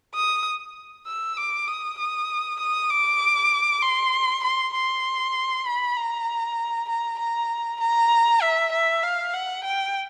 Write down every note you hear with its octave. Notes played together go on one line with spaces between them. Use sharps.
D#6
E6
D6
D#6
D#6
D#6
D6
C6
C6
C6
B5
A#5
A#5
A#5
A#5
E5
E5
F5
F#5
G5